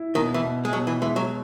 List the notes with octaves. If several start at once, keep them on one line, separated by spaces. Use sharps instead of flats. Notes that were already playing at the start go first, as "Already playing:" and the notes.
Already playing: E4
B2 D#3
E3
B2
G#3
B2 F#3
E3
E3 G#3
F#3